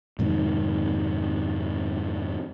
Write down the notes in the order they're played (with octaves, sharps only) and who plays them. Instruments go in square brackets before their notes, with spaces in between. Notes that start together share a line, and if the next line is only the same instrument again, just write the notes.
[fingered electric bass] F2 G#2 C3 D#3